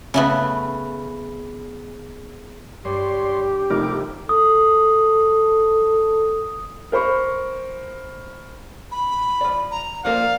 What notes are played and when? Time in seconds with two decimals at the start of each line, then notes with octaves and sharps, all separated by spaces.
0.14 C#3 A3 B3
2.85 G2 G4 C#5 D5 C6
3.70 F1 C2 F3 A3 D#4 A#4 D6
4.29 A4 D#6
6.92 A#4 C5 B5 C#6
8.92 B5
9.41 F3 D5
9.71 A#5
10.05 F3 A#3 A#4 D5 F5